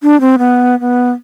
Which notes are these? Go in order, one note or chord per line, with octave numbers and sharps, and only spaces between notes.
D4
C4
B3
B3